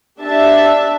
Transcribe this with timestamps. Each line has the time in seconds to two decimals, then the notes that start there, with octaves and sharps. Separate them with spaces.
0.20 D4 G4 E5 A5